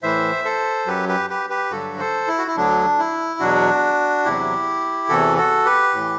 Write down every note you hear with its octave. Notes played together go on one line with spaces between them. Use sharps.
A2 E3 C5 E5
A4 C5
F#2 F#3 G4 B4
G4 B4
G4 B4
G4 B4
G2 D3 F#3 F#4 A4
A4 C5
E4
F#4
E4
D2 D3 F#3 D4
E4
E2 B2 F#3 D4 F#4
E2 C3 F#3 E4 G4
E2 C3 E3 F#4 A4
F#4 A4
G4 B4
A2
E3